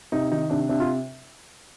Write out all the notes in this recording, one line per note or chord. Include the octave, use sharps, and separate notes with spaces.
C3 D#4
D#3 D#4
C3 D4
C3 D4
F4